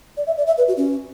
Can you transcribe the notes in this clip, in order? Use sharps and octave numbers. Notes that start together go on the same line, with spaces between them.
D5
E5
D5
E5
B4
F#4
C#4